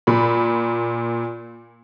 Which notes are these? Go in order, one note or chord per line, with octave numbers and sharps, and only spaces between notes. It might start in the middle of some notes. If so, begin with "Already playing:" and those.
A#2 B5